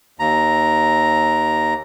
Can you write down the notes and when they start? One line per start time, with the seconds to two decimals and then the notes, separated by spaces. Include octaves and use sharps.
0.19 D#2 A#5